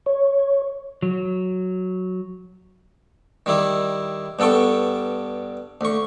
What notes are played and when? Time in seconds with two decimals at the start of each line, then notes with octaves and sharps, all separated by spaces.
0.06 C#5
1.03 F#3
3.46 D#3 G3 E4
4.39 G2 B3 A4 G5 C#6
5.81 D2 C#6